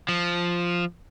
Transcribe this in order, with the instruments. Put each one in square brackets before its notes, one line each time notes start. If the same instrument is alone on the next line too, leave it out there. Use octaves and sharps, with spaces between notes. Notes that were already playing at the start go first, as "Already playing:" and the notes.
[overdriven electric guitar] F3